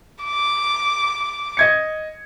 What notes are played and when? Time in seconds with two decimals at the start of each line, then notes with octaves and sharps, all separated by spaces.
0.24 D6
1.57 D#5 G#6 C#7